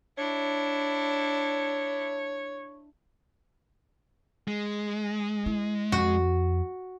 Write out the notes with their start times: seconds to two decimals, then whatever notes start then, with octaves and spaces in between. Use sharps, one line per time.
0.18 D4 E4 C#5
4.48 G#3
5.46 E4
5.92 F2 F#4